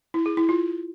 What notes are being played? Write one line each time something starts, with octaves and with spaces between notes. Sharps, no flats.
E4
G#4
E4
F4